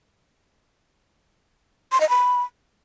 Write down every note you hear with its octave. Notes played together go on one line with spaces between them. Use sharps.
C6
D#5
B5